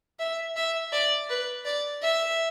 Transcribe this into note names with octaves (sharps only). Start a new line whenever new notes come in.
E5
E5
D5
B4
D5
E5